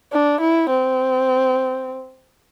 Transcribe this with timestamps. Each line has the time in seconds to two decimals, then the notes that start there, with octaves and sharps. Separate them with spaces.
0.13 D4
0.41 E4
0.70 C4